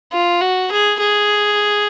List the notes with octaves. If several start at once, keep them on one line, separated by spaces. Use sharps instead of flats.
F4
F#4
G#4
G#4